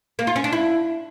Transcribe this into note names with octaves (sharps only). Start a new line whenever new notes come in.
A#3
F4
C#4
D4
E4